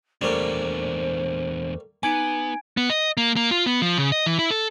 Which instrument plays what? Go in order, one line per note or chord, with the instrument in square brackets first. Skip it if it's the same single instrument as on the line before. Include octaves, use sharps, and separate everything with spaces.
[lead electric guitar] E2 D4 [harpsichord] G3 A3 A#3 [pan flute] C5
[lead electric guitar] B3 [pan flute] D#4 [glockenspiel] G#5 G#6 D7 [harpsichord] D6
[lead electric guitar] B3
D#5
A#3
A#3
F4
B3
F3
C#3
D#5
E3
E4
A4